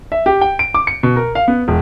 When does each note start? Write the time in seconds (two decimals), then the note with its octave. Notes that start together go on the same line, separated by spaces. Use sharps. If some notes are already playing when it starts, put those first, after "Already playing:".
0.12 E5
0.26 G4
0.41 G5
0.59 D7
0.74 D6
0.87 C#7
1.03 B2
1.16 A#4
1.35 F5
1.48 B3
1.68 E1